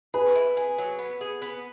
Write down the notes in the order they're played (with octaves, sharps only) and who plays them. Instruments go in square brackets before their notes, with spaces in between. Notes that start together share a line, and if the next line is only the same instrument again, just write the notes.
[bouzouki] G#4 [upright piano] B4
[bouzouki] E4
G#4
F#3
B3
G#4
B3